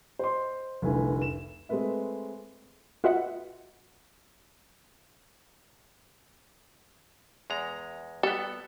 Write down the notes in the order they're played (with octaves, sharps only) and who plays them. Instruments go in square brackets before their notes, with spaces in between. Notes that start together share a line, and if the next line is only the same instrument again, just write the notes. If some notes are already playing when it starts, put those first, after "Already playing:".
[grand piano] C5 D#5 C6
F1 C2 D3 A3 B4 G#5
E7
G#3 A3 C4 B4 E5
[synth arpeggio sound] F4 F#4 B4 D#5 E5 F#5
[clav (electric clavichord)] E2 G#3 A#5
[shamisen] G3 [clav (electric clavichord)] B3 A4